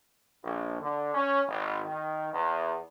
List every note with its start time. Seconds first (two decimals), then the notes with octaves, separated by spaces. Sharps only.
0.44 A#1
0.80 D3
1.14 C#4
1.48 G#1
1.85 D#3
2.33 E2